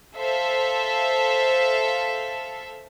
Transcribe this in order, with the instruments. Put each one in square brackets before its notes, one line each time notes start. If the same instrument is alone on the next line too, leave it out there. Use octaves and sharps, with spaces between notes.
[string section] A4 C5 E5 F5